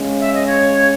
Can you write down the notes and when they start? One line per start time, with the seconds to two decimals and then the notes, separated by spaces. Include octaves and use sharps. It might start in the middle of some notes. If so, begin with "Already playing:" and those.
Already playing: C#3 G#3 C#4
0.21 E5
0.34 D#5
0.47 C#5